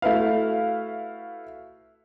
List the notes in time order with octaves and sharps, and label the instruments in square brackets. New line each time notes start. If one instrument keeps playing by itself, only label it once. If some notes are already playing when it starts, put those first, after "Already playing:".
[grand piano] A3 E4 F#4 B4 F5